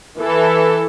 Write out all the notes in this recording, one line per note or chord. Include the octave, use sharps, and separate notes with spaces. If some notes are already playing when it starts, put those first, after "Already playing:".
E3 A4